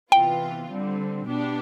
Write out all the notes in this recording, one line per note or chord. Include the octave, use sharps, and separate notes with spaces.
C3 E3 B3 F4 G5
D3 G3 C4
B2 B3 D4 G4